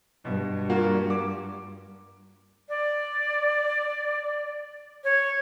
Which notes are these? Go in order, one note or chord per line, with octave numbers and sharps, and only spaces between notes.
G2 B2
A#3 F4 F#4
D6
D5
C#5